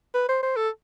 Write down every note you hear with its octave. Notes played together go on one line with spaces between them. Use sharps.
B4
C5
C5
A4